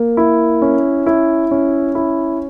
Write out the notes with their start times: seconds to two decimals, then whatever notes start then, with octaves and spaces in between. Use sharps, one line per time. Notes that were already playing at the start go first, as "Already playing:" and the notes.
Already playing: A#3
0.17 E4
0.62 C#4
1.06 E4
1.51 C#4
1.95 E4